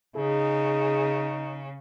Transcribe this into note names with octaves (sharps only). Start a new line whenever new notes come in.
C#3 D#4 G#4